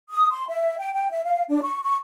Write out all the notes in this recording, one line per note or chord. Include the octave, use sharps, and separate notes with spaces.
D#6
C6
E5
G5
G5
E5
F5
D4
C#6
C#6